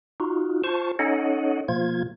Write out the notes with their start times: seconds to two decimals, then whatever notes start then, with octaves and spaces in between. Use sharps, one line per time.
0.20 D#4 F4 F#4
0.64 F4 C5 A5 C#6
0.99 C#4 D#4 A4 C#5 D#5 F#5
1.68 B2 F3 A#3 F4 G#6